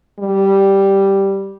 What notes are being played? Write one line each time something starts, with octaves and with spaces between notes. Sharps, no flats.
G3